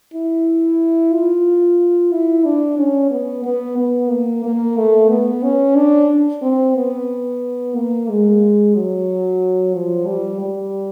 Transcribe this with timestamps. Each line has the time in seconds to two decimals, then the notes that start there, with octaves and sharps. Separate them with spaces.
0.14 E4
1.13 F4
2.12 E4
2.45 D4
2.78 C#4
3.11 B3
3.45 B3
3.78 B3
4.10 A#3
4.44 A#3
4.77 A3
5.10 B3
5.43 C#4
5.76 D4
6.42 C4
6.76 B3
7.76 A#3
8.09 G#3
8.75 F#3
9.74 F3
10.06 G3
10.40 G3